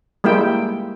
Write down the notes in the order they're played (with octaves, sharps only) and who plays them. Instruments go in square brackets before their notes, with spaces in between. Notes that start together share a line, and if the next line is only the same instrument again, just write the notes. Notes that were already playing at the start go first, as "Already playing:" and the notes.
[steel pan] G3 G#3 A#3 E4 G5